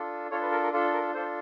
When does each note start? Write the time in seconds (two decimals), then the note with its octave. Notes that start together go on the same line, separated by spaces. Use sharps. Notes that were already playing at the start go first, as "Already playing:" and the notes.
Already playing: D4 F4 A4
0.31 D4 F4 A4 C#5
0.41 B4
0.52 A#4
0.63 A#4
0.73 D4 F4 A4
0.93 A#4
1.14 D4 F4 A4 C5